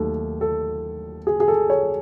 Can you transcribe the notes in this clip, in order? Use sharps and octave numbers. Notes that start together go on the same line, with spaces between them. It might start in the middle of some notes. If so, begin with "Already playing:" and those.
Already playing: D#2 D#3 F#3 A3 A4
A4
G#4
G#4
A4
C#5